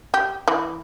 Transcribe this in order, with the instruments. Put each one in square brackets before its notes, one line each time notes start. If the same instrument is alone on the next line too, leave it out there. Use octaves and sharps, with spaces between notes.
[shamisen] G4
E3